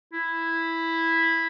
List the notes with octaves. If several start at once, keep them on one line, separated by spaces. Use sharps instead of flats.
E4